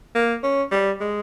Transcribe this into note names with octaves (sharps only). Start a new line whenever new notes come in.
A#3
C#4
G3
G#3